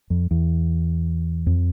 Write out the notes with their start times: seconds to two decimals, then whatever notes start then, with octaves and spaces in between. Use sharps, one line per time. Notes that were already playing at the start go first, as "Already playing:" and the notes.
0.10 F2
0.31 E2
1.46 F2